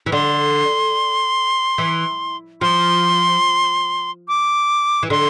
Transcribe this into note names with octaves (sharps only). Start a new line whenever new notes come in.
E3
D3 C6
E3
F3 C6
D6
E3
D3 C6